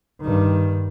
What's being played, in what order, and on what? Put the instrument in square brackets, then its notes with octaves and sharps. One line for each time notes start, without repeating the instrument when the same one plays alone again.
[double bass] G2 D#3